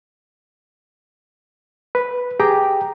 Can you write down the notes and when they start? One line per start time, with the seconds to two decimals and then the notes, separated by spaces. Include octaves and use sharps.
1.95 B4
2.40 G4 G#4 G5 A#5 D6